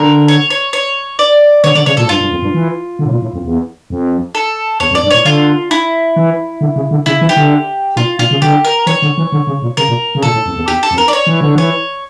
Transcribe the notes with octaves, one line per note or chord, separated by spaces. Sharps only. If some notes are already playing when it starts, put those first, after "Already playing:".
Already playing: D3 A#4
C#5
C#5
C#5
D5
D3 C#5
D3 D5
C#3 C#5
A#2 A4
A2
G2 F4
G2
F2
G2
E3
D3
A2
A#2
A2
F2
E2
F2
A4
E2 C#5
F2
D5
G2
A2 C#5
D3 F4
E4
E3
D3
C#3
D3
C#3 E4
E3
G4
D3
A#2 F4
A#2 F4
C#3
D3 G4
A#4
E3 C#5
D3
E3
D3
C#3
A#2
C#3 A#4
A#2
C#3
A#2 A4
A2
F2
E2
E2 G4
A4
F2
A#4
D5
C#5
E3
D3
E3 C#5